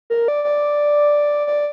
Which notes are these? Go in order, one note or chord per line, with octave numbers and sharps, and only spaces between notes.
A#4
D5
D5
D5